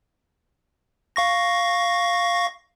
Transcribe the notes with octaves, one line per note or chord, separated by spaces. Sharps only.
F5 C#6 A#6